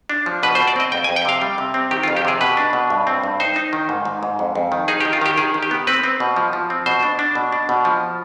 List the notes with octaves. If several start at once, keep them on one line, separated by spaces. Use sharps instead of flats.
D4
F3
B2 B4
C5
B2
D5
C4 D#5
F2 G5
G#5
F2
G5
C3 F5
G3
C3
C4
D#3 G4
F4
F2
G4
C3 G#4
B2 B4
D4
B2
G2
C4
G2
D#4 C5
D#4
D#3
G#2
G#2
G#2
F2
F2
D#3
D#4 G#4
G4
D#3
F4
D#3 G4
D#3 G#4
D#3
G4
B3
C4 B4
C4
B2
F3
F3
C4
B2 C5
D4
D4
B2
D4
B2
F3